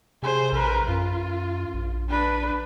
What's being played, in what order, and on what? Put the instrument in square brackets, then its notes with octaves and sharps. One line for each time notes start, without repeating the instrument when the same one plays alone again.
[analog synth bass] C3 [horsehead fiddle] G#4 C5
[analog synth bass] A#1 [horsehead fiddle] A#4 B4
[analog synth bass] F#2 [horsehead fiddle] F4
[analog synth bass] A#1
[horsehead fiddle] D4 B4